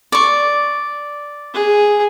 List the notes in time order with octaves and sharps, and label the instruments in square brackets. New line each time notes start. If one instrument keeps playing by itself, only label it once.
[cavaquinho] D5 C#6
[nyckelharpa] G#4